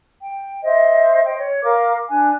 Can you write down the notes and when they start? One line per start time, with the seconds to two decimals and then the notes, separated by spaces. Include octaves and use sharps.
0.22 G5
0.64 C5 D#5 E5
1.25 C5 D#5 G5
1.39 C#5
1.64 A#4 F5 D6
2.09 D4 G#5 F#6